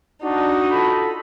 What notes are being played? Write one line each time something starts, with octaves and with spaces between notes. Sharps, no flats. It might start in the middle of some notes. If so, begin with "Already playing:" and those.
D4 D#4 F#4
F4 A4 B5